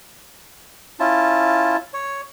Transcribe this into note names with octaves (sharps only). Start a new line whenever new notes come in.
C#4 E4 F4 A5
C#5